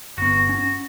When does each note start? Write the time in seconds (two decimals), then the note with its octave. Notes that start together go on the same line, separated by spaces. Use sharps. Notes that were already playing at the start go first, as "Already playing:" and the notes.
0.18 G1 B3 F#4
0.49 C#4